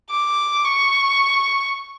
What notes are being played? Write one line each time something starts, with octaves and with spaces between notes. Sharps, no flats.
D6
C#6